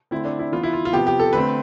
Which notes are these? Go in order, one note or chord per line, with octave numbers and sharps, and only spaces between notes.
D3 A3 C4 E4
D4
E4
E3 B3 F4
E4
F4
F4
C3 F3 B3 G4
G4
A4
D3 A3 C4 B4